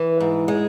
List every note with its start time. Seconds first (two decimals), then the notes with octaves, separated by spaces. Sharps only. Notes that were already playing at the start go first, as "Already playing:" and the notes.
Already playing: E3
0.20 G#2
0.48 G#3